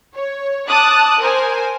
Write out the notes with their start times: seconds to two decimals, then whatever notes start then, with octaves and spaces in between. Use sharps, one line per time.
0.16 C#5
0.69 A5 D6 D#6 F#6
1.20 A#4 C5 G#5